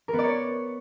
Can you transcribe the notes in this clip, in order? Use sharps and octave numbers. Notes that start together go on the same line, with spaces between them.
A#4
B3
D5
C#5